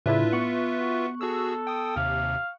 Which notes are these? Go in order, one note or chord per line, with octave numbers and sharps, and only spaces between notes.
A2 C#3 D4 E4 F4 B4 E5
B3 C#6 F#6 C#7
F#4
F#4 G#4 A4 E6
G5 D#6
D#2 C3 F5